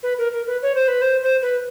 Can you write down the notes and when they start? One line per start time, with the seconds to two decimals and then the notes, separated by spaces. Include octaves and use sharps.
0.03 B4
0.18 A#4
0.32 A#4
0.47 B4
0.62 C#5
0.75 C5
0.88 B4
1.02 C5
1.23 C5
1.42 B4